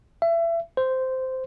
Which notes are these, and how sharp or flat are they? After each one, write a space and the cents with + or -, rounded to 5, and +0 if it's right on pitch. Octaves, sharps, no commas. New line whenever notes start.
E5 +30
C5 -10